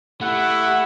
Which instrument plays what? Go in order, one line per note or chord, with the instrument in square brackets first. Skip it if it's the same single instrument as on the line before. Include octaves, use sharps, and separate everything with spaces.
[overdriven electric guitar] A3 [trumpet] E4 [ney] G4 [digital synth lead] F#5